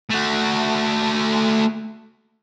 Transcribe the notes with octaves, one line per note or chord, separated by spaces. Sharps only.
A3 F#4